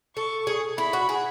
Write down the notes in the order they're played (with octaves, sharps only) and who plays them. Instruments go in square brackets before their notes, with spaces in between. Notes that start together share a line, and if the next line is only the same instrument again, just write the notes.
[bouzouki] A4 [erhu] C#6
[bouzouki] G#4
[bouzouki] E4 [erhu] B5
[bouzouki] F#4
G#4